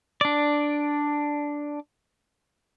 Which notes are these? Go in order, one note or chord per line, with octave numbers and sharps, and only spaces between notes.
D4 D5